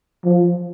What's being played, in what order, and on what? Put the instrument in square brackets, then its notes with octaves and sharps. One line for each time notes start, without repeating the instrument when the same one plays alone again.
[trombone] F3